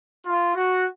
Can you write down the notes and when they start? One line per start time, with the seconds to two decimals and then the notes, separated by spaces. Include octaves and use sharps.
0.25 F4
0.54 F#4